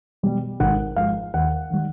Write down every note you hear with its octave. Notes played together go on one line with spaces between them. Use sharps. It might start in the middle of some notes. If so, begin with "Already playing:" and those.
B2 G3
G#1 F#5
G#2 F3 G#3 F5
D#2 F#5
D#3 G3